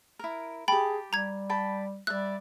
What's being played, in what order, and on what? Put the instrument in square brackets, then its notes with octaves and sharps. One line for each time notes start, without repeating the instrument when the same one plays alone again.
[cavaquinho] E4 A#4
[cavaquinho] G4 A5 [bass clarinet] G#4 [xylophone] G5 B5
[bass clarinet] G3 [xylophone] A#5 G#6
[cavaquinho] G5 A5 B5
[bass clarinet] G3 [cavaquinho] D5 E5 [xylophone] F#6